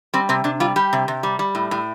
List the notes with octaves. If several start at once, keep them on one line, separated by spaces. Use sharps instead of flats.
G3 C4
C3 C4
C3 D4
G3 F4
G3 G4
C3
C3
G3
G3
A2
A2